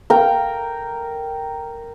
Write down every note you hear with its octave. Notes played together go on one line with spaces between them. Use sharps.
A#4 G5